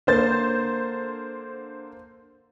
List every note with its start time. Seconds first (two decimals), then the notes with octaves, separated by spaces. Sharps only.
0.07 D3 A#3 C5 G6 A6